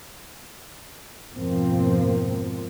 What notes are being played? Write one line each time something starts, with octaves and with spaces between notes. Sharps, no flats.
F2 G#2 B2 F3 A#3 C4